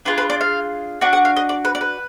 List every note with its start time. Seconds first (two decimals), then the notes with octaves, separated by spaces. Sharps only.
0.05 D4 F4 G#4 B4
0.18 B4
0.30 D5
0.41 F5
1.01 D4 F#4 F#5
1.13 F#5
1.25 F5
1.36 D#5
1.49 D5
1.65 B4
1.75 D5
1.81 B4